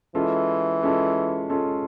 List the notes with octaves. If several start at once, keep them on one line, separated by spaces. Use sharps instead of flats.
E3 G#3 C#4 F4 A4
G#3 C#4 F4 A4
G#3 C#4 F4 A4